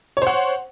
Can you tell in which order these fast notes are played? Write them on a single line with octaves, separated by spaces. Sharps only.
C#5 C5 F#5